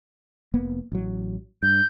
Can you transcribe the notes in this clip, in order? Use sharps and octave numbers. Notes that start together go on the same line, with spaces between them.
F1 A#3 B3
A1 F#3
G2 G6